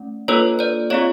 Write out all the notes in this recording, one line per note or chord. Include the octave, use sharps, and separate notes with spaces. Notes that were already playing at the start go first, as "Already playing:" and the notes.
Already playing: A3 C#4
A#3 D4 F4 A4 B4 C#5
C5 D5
C4 F4 G#4 C#5 D#5